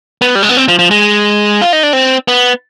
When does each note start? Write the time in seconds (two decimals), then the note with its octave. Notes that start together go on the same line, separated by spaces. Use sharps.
0.22 B3
0.35 G3
0.43 G#3
0.49 B3
0.57 C4
0.68 F3
0.79 F3
0.91 G#3
1.62 F4
1.73 D#4
1.83 D4
1.93 C4
2.28 B3